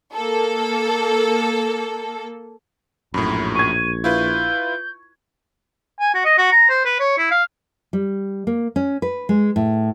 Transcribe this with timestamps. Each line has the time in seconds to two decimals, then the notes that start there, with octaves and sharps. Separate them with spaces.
0.13 A#3 A4
3.14 A#1 F#2 A2 B5
3.55 C#6 G#6 D#7
4.04 E4 F4 B4 G6
5.99 G#5
6.14 F#4
6.25 D#5
6.38 F#4
6.52 A#5
6.69 C5
6.85 B4
7.00 C#5
7.18 E4
7.31 F5
7.93 G3
8.47 A#3
8.76 C#4
9.02 B4
9.29 G#3
9.56 A2